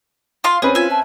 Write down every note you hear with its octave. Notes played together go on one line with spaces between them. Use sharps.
F4 F5 C6
C4 C#4 G#4 B4
F4 E5 G#5
A5